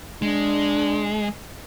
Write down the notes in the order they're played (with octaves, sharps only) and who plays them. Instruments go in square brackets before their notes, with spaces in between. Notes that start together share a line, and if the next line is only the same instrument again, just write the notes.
[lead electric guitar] G#3 [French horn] D4